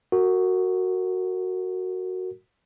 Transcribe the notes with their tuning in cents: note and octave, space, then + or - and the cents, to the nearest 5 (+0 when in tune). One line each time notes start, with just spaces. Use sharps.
F#4 +0 A#4 -25